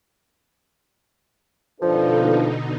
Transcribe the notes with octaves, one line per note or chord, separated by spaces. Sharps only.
F2 B2 D3 F3 D4 D#4 A4 B4